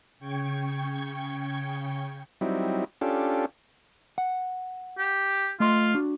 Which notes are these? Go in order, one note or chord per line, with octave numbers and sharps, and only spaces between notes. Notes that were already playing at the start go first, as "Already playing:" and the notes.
C#3 G5 C#6 G#6
F#3 G3 C4 D#4 E4
C#4 D4 F4 G4 A4
F#5
G4
A3 F4 D#5 C6
D4 F#4